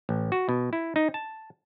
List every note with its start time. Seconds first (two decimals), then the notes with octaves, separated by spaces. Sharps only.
0.09 A1
0.32 F#4
0.49 B2
0.73 E4
0.96 D#4
1.14 A5